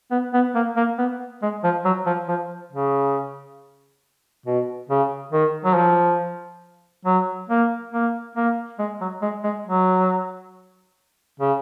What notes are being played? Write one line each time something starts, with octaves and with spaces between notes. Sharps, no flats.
B3
B3
A#3
A#3
B3
G#3
F3
F#3
F3
F3
C#3
B2
C#3
D#3
F#3
F3
F#3
A#3
A#3
A#3
G#3
F#3
G#3
G#3
F#3
C#3